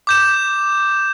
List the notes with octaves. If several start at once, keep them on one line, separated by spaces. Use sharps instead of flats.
D6 G6 E7